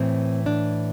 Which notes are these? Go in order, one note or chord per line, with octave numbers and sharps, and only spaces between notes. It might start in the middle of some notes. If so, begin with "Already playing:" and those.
Already playing: A2 E3 C4
D4